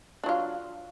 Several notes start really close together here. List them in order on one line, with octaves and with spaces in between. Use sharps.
D4 F#3 F4